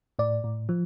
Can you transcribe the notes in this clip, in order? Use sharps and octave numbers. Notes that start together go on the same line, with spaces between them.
A2 D5
A2
F3